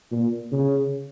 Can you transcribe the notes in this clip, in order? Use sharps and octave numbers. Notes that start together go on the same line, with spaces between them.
A#2
C#3